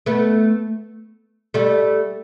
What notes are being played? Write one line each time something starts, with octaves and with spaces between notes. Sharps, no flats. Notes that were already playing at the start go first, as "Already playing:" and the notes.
A3 B3
G3 A3